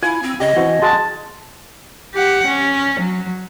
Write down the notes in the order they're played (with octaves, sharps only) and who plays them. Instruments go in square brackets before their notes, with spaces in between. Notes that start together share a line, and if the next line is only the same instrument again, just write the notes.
[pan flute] E4 [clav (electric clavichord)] F4 [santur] G#5
[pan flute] C4
[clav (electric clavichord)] C#3 G4 [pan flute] D#5
[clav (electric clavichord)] E3 C4 F#4
[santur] G#3 [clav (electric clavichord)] F#4 F5 F#5 [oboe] A5
[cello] G4 F#5
C#4
F#3